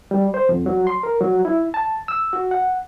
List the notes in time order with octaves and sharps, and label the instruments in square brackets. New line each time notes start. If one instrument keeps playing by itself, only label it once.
[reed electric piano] G3
C5
F2
F#3
C6
A#4
F#3
E4
A5
E6
F#4
F#5